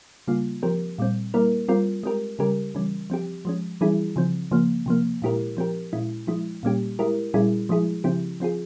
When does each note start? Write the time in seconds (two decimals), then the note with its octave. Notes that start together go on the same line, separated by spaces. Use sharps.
0.28 C#3 G3 A#3 F4
0.63 F3 C4 G4 A#4
0.98 A#2 G3 C4
1.34 G3 A#3 E4 A#4
1.68 G3 C4 F4 A#4
2.03 G#3 C4 G4 A#4
2.39 C#3 G3 C#4 G4 A#4
2.75 C#3 E3 G3 C#4
3.10 F3 C4 G4
3.45 F3 G#3 C#4
3.81 E3 G3 C#4 E4 G#4
4.16 C#3 F3 C4
4.51 C#3 F3 A#3
4.86 C3 F3 A#3
5.22 A#2 G#3 E4 G4 A#4
5.57 F3 C4 G4 A#4
5.93 A#2 G#3 C#4 E4
6.27 F3 G#3 E4
6.63 A#2 G3 A#3 C#4 G4
6.99 G#3 E4 G4 A#4
7.34 A#2 G3 C#4 E4 G#4
7.69 F3 G#3 E4 G#4
8.04 C#3 F3 C4 E4 G4
8.40 F3 C4 F4 G#4